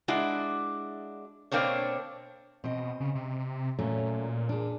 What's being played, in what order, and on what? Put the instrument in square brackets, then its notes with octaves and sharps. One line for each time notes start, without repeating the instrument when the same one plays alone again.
[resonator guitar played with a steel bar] G#3 D4 E4 F#4
B2 A#3 C4 D4 C#5
[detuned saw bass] B2 [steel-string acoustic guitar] C4 D#5
[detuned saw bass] C#3
C3
[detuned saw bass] A#2 [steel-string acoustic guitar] F#3 A3 C#4
[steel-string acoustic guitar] D4 G#4